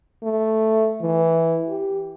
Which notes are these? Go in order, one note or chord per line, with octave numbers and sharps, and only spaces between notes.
A3
E3
G4